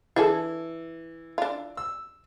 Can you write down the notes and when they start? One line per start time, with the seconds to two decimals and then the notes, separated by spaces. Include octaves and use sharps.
0.16 E3 D4 G#4 A4
1.38 D4 F4
1.77 E6